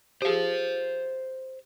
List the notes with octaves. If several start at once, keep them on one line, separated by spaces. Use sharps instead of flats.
G4 G#4 C5 F5